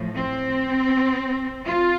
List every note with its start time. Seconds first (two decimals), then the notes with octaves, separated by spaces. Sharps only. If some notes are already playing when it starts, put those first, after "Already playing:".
Already playing: A2 F3
0.15 C4
1.65 F4